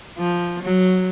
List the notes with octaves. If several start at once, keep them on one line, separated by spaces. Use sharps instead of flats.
F3
F#3